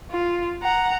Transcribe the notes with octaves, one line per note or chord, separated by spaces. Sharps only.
F4
F#5 A#5